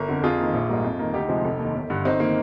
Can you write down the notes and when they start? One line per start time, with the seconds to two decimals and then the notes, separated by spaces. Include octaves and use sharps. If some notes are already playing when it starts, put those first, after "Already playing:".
Already playing: G1 A#4
0.08 F2 D3
0.23 F2 F4 G#4
0.38 D#3 A#3
0.54 A#1
0.69 G#2 G3 A#3
0.84 F2
0.99 D#3 A#3
1.14 D2 D#4 G4
1.29 C3 F3 G#3
1.45 F1
1.59 D#2 D#3
1.75 G1
1.90 G2 D3
2.05 G1 C4 D#4
2.20 D#3 A#3